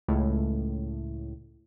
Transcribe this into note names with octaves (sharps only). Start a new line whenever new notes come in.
C#2 A2